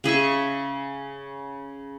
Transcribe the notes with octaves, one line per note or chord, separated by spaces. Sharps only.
C#3 G#4 E5 C#6